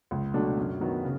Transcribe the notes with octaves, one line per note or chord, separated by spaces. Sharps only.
C#2
B2 F#3 A3 D4
F#2
D#3 F#3 B3
C#3